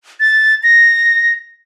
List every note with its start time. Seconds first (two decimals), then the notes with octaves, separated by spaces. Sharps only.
0.20 A6
0.63 A#6